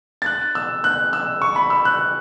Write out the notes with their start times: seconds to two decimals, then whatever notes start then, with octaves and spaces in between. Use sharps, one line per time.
0.22 A6
0.26 F#6
0.55 E6
0.84 F#6
1.13 E6
1.42 C#6
1.56 B5
1.70 E6
1.85 F#6